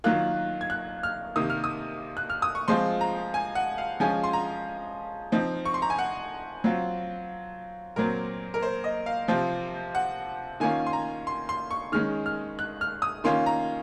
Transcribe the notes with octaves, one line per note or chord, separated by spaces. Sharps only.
D#3 F#3 A#3 F4 F#6
G#6
F#6
F6
C3 D#3 A#3 D#6
F6
D#6
F#6
F6
D#6
C#6
F3 G#3 C4 F4 C6
A#5
G#5
F#5
F5
F3 G#3 C#4 F4 G#5
C6
A#5
F3 C4 D#4
C#6
C6
A#5
G#5
F#5
F#3 C4 F4
A#2 F#3 C4 A#4
A#4
C5
D#5
F5
C3 F3 C4 F4
F#5
D#3 A#3 C#4 F4 G#5
C6
A#5
C6
C6
C#6
D#3 G#3 C#4 F6
F6
F#6
F6
D#6
D#3 A#3 C#4 F4 C6
A#5